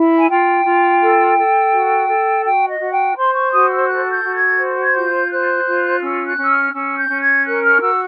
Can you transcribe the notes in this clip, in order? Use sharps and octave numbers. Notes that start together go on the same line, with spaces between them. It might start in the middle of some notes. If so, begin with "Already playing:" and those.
Already playing: E4
G#5
F4 G5
F4
A4
A4
F#4
A4
F#4 G5
D#5
F#4
G5
C5 C6
C#6
F#4 D#6
E6
A4 F#6
G6
F#4
G#6
C5
G#6
F4 G6
C5 F#6
F4
C#4 E6
F#6
C#4 E6
F6
C#4 E6
G6
C#4
G#6
A#4 F#6
F6
F#4 E6